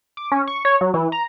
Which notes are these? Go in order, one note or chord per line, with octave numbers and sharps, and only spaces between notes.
D6
C#4
C#6
C#5
F#3
E3
A#5